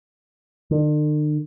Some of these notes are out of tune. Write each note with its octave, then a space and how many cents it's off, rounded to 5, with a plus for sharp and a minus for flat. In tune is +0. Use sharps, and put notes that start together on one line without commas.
D3 +45